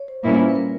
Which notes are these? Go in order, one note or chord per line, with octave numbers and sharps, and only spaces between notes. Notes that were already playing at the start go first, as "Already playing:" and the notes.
Already playing: C#5
C5
A#2 G3 A#3 C#4 E4 B4
B4
A#4